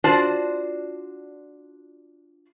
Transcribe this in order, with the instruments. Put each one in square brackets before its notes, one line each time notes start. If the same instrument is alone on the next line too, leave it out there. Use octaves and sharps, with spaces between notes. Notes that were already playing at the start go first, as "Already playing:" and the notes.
[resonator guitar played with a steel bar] D4 F4 F#4 C5 D5 A5